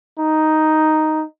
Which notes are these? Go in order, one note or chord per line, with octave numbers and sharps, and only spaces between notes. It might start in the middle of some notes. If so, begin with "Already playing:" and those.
D#4